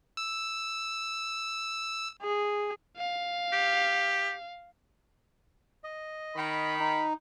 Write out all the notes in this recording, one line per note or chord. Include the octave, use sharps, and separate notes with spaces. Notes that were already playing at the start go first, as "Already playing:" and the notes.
E6
G#4
F5
G4
D#5
D#3 B5
D#4